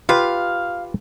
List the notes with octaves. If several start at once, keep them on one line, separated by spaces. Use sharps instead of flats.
F4 G4 B4 F5